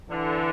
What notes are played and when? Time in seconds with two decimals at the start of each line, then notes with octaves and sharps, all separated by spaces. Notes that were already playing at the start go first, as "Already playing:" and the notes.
0.11 D3 E3